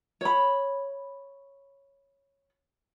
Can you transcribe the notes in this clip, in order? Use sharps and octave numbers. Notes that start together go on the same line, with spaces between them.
C#5 B5